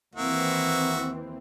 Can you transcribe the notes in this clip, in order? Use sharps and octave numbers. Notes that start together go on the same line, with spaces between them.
D#2 E3 A#3 C4 F#4 E5